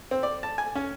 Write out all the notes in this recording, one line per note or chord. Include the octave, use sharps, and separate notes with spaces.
C4
D5
A5
G#5
C#4